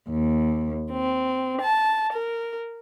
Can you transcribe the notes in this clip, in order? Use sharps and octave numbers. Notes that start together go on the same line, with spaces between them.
D#2
C4
A5
A#4